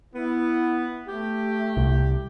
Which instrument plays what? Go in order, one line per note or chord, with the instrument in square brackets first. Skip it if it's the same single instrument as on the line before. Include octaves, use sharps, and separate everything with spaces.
[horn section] B3 [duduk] E4
[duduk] A3 [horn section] G4
[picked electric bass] C2